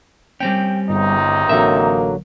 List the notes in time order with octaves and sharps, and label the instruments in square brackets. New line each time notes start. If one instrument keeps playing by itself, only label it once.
[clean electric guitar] G3 C4 C#4 [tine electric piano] G5
[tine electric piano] G1 [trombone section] C#2 C3 D#4
[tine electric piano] A1 D3 F#3 [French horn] A#3 [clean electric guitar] C4 E5